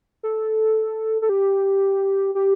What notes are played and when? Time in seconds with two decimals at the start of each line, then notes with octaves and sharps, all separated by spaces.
0.23 A4
1.22 A4
1.29 G4
2.35 G4